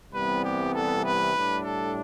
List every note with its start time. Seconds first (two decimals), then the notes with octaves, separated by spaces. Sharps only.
0.12 C2 C3 E3 G3 B3 B4
0.42 G4
0.73 A4
1.03 B4
1.33 A2 G3 D4
1.64 A4